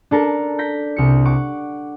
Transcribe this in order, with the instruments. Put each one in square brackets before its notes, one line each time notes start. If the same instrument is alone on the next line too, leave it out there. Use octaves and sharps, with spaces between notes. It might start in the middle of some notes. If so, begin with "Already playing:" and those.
[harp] D4 A4 A#4 A5
G6 A#6 B6 D7
C2 C#7
F#5 C#6 D6